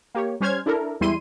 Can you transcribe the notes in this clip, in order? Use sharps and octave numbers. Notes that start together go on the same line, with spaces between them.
A#3 G4 C#5
G3 C#4 C5 F6 G#6
D4 E4 A4 A#4
E2 G3 G#3 E4 C6 D#7